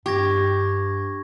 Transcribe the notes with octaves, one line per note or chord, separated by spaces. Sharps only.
G2 G4 C#6 G#6 A#6